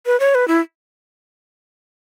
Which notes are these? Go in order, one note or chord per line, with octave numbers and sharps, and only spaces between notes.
B4
C#5
B4
E4